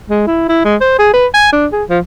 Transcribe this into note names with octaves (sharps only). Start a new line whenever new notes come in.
G#3
E4
E4
G#3
C5
G#4
B4
G#5
D4
G#4
F3